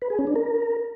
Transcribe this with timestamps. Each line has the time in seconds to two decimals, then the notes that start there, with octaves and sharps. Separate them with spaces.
0.02 B4
0.10 G#4
0.19 C#4
0.27 D4
0.36 A#4